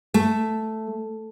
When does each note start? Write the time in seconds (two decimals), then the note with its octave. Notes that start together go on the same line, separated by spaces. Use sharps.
0.14 A3